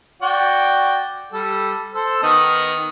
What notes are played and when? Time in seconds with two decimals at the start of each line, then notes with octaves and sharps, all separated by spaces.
0.22 F#4 D5 G5
1.32 G3 A4
1.94 A4 C5 E6
2.23 D#3 B3 D#4